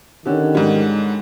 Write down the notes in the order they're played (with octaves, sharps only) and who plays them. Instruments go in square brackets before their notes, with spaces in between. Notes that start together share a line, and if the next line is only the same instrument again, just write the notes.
[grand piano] D3 C#4 G4 [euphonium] D#3
[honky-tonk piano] G#2 G3